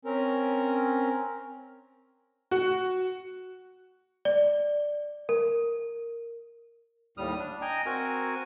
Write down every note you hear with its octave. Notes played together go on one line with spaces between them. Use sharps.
C4 C#4 A#4
F#4
D5
A#4
D#2 A2 G3 D#6 F6
D4
D#5 G5 G#5 A#5
C4 F#4 A#4 G#5